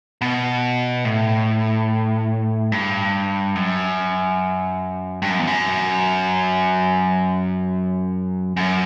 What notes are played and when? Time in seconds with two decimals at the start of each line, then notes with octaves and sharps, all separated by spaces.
0.21 B2
1.05 A2
2.72 G2
3.55 F#2
5.22 G2
5.30 F#2
5.39 E2
5.47 F#2
8.57 F#2